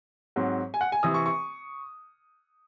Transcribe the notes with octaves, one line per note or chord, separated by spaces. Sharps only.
G#2 F#3 C4
G#5
F#5
G#5
C3 E3 C4 D#6
C#6
C#6